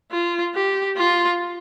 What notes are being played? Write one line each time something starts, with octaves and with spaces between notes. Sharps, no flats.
F4
G4
F4